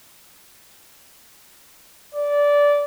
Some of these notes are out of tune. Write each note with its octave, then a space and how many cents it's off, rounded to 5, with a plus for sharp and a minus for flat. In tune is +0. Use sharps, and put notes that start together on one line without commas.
D5 -15